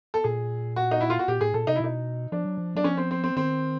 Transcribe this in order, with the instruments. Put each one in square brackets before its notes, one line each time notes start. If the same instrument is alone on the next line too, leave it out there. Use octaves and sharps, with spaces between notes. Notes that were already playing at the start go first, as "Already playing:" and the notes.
[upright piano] A4
[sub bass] A#2 [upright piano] G#4
[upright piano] F#4
D#4
E4
F4
F#4
[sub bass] A#2 [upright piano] G4
[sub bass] A2 [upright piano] G#4
[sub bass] A#2 [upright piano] A4
[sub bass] C3 [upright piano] D#4
[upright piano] E4
[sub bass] B2 [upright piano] D#4
[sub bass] F3 [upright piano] D4
[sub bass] F#3
F3
[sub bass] F#3 [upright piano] D4
[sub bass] F3 [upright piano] C#4
[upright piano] C4
C4
C4
[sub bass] D#3 [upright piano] C4